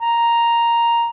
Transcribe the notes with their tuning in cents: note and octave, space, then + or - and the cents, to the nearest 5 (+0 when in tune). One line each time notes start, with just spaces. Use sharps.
A#5 +0